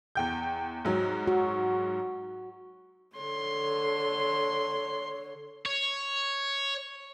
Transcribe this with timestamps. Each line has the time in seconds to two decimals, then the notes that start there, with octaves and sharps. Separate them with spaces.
0.15 E2 G5 G6
0.85 G#2 F#3
1.27 F#4
3.17 D3 C#5 C6
5.66 C#5